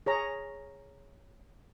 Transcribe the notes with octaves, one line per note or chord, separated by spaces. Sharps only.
G#4 C#5 A#5